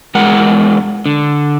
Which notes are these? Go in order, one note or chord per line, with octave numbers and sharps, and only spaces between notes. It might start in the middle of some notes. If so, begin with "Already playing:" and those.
E2 G#3 A#4 F#5
D3